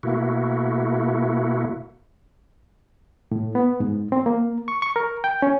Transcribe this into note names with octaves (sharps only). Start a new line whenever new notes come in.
B2 A3 A#3 E4 F#4
A2
B3
G#2
C4
A#3
C#6
C#6
A#4
G5
C#4